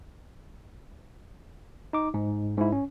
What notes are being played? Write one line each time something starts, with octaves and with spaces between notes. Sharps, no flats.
D#4 D6
G#2
G#2 E4
C#4